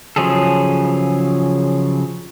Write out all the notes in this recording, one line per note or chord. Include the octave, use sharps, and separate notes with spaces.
C#3 F3 F#3 G#4 A4